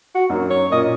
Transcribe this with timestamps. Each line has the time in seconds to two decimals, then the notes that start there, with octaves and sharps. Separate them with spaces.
0.15 F#4
0.30 F#2 F#3 A#3 D#4
0.51 C#5
0.71 A#2 A#3 C#4 D#5